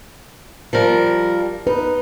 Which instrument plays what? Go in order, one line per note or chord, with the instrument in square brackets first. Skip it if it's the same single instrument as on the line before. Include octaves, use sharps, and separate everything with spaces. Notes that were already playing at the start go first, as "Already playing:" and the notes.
[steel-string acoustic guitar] F3 G3 A#4
[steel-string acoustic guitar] D#4 [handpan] B4